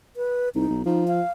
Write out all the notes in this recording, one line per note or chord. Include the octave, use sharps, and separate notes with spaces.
B4
C2 D#4
B1
F3 D#4
F5